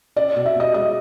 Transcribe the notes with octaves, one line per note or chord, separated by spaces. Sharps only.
C#4 D5
B2
E5
B2 D#5
G#3 D#5